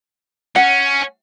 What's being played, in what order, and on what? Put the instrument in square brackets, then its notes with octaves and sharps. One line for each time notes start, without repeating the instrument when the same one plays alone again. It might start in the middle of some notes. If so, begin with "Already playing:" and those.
[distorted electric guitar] C#4 [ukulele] F#5